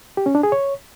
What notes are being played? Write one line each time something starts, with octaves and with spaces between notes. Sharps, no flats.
G4
C#4
D4
G#4
C#5